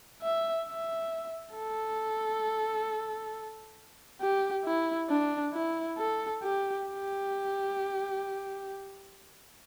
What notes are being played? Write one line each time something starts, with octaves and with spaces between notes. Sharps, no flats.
E5
E5
A4
G4
E4
D4
E4
A4
G4
G4